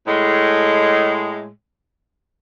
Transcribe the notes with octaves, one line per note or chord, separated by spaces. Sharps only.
A2 G#3